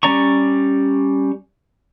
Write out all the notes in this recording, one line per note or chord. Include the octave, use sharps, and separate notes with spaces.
G3 C#4 D5 A#5 C#6